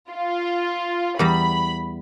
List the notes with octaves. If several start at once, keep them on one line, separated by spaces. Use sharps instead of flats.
F4
E2 G3 A#5 B5